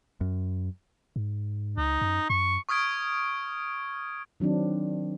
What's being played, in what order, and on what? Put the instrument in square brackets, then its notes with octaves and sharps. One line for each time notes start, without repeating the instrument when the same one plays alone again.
[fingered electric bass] F#2
[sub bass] G#2
[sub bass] C#2 [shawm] D#4
[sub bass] F#2
[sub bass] F#2 [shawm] C#6
[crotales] C#6 D#6 F6 G#6 D7
[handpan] D#3 F#3 C4 D4